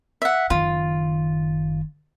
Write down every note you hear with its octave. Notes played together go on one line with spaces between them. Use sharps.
E5 F#5
F#1 D#3 F4